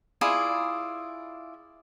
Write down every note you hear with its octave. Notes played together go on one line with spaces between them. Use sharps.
E4 F4 G#4 D5